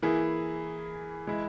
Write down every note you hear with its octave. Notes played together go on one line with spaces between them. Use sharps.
E3 A#3 E4 G#4
E3 G#3 E4